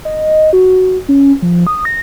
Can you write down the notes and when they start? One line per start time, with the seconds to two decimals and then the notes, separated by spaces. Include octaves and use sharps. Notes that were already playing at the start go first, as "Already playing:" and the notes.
0.05 D#5
0.53 F#4
1.09 C#4
1.42 F3
1.67 D#6
1.85 A#6